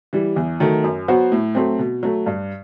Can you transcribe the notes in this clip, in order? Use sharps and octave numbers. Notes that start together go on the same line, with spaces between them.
E3 G3
E2
D#3 F#3 A3
F#2
F#3 B3 F#4 C5
A2
F#3 A3 C4
B2
F#3 A3
G2